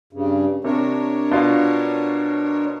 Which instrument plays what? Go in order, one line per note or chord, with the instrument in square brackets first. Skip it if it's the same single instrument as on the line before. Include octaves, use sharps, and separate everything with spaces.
[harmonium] G2 C#3
[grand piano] C3 [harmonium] D4 A#4 C#5
[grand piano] B2 F4 F5